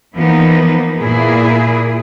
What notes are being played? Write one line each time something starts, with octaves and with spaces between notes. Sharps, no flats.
E3 F3 A#3 B3 D#4
A#2 A#3 E4 G#4